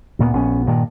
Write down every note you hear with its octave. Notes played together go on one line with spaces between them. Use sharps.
D2 A#2 G3 B3
A#1 B3 C#4
G2 A#2 D#3